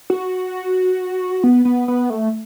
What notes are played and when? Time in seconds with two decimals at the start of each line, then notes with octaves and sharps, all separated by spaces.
0.10 F#4
1.44 B3
1.65 B3
1.88 B3
2.10 A3